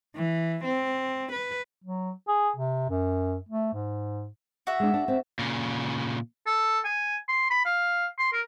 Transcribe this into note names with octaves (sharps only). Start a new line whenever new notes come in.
E3
C4
B4
F#3
G#4
C3
F#2
A3
G#2
F#4 E5
G#3 D4
D4
C4
A#2 C#3
A4
G#5
C6
B5
F5
C6
A#4